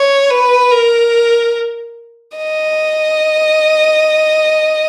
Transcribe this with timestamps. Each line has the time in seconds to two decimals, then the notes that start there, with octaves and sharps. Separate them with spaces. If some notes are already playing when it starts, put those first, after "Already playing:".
Already playing: C#5
0.30 B4
0.71 A#4
2.36 D#5